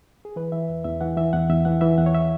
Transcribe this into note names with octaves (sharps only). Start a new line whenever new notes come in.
G#4
E3 B4
E3 E5
E2
E2 E5
E3 F#5
E3 E5
E2 F#5
E2 E5
E3 F#5
E3 E5
E2 F#5
C#5
E5